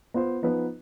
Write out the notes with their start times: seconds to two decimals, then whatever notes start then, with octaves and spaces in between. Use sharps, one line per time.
0.14 B3 F4 C5
0.43 F3 B3 D#4 B4